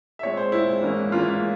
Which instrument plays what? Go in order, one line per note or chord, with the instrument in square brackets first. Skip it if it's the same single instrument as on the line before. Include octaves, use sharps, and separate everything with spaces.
[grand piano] E5
A#2 G#3 C4 C#5
C5
A#2 G#3 C4 E4
G#2 E3 A#3 C#4
G#2 E3 A#3 C#4 F4